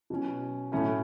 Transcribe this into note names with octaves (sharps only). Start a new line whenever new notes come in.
B2 F#3 C#4
A2 F#3 A3 C#4 E4